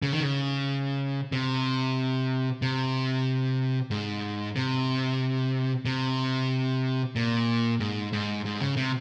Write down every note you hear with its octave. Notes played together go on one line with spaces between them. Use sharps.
C#3
D#3
C#3
C3
C3
G#2
C3
C3
A#2
G#2
G#2
G#2
C#3
C3